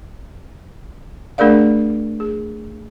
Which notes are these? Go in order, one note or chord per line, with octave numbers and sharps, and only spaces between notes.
A3 D4 G#4 A#4 D5 F5
G#4